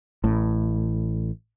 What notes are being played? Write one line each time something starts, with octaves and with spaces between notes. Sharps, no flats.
A1 A2